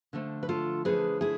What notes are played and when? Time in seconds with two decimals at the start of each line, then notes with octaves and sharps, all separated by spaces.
0.13 D3 F3 A3
0.43 B4
0.49 F4 A4
0.85 D3 F3 A3 G#4 B4
1.21 E4 G#4